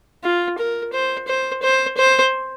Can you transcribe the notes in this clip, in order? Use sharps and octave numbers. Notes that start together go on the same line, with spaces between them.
F4
A#4
C5
C5
C5
C5